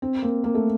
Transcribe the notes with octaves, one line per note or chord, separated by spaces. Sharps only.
C4
A#3
A#3
A3